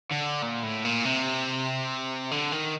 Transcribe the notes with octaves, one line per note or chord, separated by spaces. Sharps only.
D3
A#2
A2
A#2
C3
D3
D#3